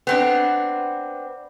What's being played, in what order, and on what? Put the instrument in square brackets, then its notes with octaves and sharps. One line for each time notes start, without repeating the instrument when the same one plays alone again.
[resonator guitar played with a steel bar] B3 C4 D4